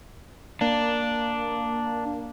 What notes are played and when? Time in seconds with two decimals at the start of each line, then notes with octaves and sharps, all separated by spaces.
0.61 A#3 D4